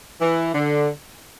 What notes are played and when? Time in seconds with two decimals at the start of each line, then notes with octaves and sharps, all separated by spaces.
0.21 E3
0.54 D3